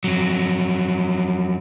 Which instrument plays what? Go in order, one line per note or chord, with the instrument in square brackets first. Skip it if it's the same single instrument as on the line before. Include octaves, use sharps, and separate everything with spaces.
[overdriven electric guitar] F2 F#3